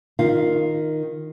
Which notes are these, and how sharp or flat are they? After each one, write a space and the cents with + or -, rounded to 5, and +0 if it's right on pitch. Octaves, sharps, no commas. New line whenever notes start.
D#3 +0 F4 +0 F5 +0